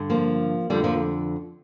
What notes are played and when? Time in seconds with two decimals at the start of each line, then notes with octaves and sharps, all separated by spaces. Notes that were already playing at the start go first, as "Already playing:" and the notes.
Already playing: G2 D3
0.10 F3 A#3
0.70 F2 D3 G3
0.84 F3 A#3